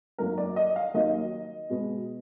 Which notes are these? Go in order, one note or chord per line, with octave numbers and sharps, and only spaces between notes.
F#2 D#3 F#3 A#3 A#4
D5
D#5
F5
D#2 D#3 F#3 A#3 D#5
B2 G#3 B3